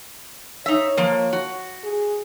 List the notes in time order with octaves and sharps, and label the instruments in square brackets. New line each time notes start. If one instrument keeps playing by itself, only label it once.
[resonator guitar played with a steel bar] D#4 E5 [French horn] C#5
[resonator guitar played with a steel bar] F3 A#3
F#4
[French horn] G#4